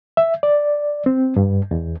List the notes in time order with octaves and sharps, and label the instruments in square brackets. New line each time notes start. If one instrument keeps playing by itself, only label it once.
[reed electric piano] E5
D5
C4
G2
E2